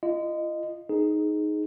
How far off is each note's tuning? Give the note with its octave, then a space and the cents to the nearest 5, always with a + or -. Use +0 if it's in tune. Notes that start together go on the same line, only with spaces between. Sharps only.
F4 -40 D#5 -15
D#4 +0 G#4 +15